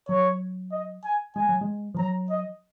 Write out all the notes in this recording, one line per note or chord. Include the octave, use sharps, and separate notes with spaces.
F#3 C#5
D#5
G#5
G#3 G#5
F#3
G#3
F3
F#3 A#5
D#5